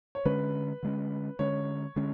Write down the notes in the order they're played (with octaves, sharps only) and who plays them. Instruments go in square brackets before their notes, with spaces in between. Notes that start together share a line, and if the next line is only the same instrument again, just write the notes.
[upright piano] C#5
[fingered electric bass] D3 G#3 C#4 [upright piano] B4
[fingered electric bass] D3 G#3 C#4
[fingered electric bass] D3 G#3 C#4 [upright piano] C#5
[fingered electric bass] D3 G#3 C#4